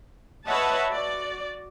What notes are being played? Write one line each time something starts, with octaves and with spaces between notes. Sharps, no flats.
B4 C#5 D#5 E5 F#5 A5
F#4 D5